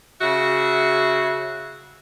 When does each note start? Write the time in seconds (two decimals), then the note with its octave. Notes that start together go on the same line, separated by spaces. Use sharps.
0.21 C#3 F#4 E5